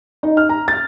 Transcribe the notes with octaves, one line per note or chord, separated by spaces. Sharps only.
D#4
F6
A#5
A6